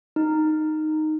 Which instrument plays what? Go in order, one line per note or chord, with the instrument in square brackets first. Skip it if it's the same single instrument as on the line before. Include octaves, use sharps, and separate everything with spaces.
[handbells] D#4